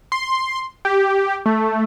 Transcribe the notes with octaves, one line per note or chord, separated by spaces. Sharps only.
C6
G4
A3